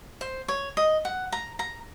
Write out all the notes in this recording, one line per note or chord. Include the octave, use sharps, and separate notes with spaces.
C5
C#5
D#5
F#5
A#5
A#5